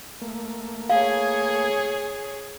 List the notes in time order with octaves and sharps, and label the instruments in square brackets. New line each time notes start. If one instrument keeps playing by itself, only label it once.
[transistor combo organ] A3 A#3
[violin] G#4 C#5 [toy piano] F5